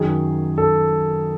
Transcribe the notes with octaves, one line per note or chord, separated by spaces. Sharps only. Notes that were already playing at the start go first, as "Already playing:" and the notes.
Already playing: F#2 D#3 F#3 G#4
A4